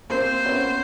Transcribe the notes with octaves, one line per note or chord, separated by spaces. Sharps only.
A#3 C4 C5
B3 C#4